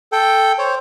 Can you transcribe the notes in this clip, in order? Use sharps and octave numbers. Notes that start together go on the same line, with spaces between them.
A4 G5
C5 C#5